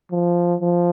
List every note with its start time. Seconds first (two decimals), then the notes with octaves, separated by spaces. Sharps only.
0.12 F3
0.60 F3